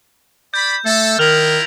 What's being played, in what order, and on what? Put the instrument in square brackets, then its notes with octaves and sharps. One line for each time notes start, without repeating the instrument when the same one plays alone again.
[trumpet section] D5 B5 [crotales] G6
[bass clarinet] A3 [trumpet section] A4
[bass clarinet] D#3 [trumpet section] E4 F4 A#4 [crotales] F6 F7 F#7